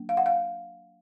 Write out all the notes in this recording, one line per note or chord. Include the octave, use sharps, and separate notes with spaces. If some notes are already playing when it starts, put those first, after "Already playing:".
Already playing: F#3 A#3 D4
F5
F#5
F5